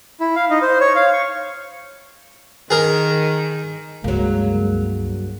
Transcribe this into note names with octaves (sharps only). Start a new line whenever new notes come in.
E4
F5
D#4
C5
C#5
F5
C#6
D#3 G#4 A#4
C#2 G2 F#3 G#3 A#3